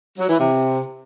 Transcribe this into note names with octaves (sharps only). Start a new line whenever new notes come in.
F#3
E3
C3